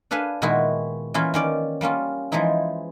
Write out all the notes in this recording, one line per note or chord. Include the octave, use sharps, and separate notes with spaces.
D4 A4 B4 F5 G#5
A#2 D#3 G#3 B3 E4 F#4
E3 A#3 C#4 E4 F4
D#3 C#4 D5
G3 A#3 C#4 F4
E3 F3 G#3 D#4 E4